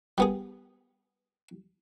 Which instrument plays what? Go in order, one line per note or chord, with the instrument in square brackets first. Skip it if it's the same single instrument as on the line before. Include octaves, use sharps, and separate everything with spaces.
[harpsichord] G3 B3 G#4